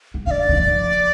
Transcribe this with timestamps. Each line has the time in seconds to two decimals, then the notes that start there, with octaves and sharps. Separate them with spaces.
0.14 F3
0.26 D3 D5 F5
0.49 D3
0.57 F3